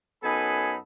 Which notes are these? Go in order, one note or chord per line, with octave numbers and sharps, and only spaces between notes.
F#2 B3 D#4 A4 G#5 B5